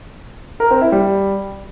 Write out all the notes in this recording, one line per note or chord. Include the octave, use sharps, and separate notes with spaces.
A#4
C4
E4
G3